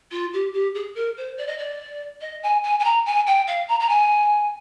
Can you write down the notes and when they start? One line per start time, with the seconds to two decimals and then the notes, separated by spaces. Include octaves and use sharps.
0.11 F4
0.33 G4
0.53 G4
0.74 G#4
0.95 A#4
1.17 C5
1.37 D5
1.47 D#5
1.58 D5
2.21 D#5
2.43 G#5
2.63 G#5
2.79 G#5
2.84 A#5
3.06 G#5
3.26 G5
3.47 F5
3.68 A#5
3.79 A#5
3.89 G#5